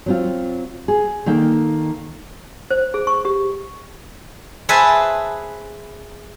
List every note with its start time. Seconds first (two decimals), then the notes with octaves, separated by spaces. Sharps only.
0.06 F#3 C4 F4
0.88 G#4
1.26 D#3 A#3 A4 G5
2.71 C5
2.94 G#4
3.07 C#6
3.25 G4
4.69 G#4 B4 C5 E5 G#5 A5